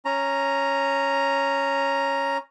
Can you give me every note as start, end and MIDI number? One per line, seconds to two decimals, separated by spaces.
0.05 2.38 61
0.05 2.38 82